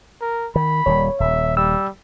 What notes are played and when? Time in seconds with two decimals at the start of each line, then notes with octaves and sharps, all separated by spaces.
0.22 A#4
0.56 D#3 B5
0.86 D#1 D#3 G3 C#5
1.20 D#1 E5
1.57 G3 E6